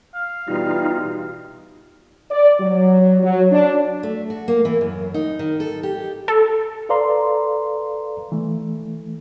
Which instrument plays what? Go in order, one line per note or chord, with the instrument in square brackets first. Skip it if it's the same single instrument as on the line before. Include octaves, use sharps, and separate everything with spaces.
[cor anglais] F5
[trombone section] B2 E3 G3 [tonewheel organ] D#4 F4
[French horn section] D5
F#3
F#3
D4
[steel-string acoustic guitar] A3
F#4
A#3
E3
F#2
D#4
D#3
A4
G4
[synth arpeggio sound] A4
[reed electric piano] A4 B4 D5 F5 A#5 C6
E3 A3